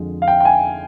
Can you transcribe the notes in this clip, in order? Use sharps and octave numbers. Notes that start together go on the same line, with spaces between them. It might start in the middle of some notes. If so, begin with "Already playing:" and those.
Already playing: F2 D3 F3 G#3
F5
G5
G5
G#5